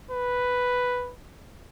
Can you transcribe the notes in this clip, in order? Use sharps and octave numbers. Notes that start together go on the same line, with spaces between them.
B4